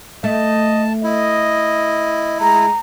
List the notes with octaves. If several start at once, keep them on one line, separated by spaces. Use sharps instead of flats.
A3 D#5 A5
E4 D#5
G#3 A#5